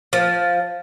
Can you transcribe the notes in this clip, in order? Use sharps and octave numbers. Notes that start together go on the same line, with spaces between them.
F3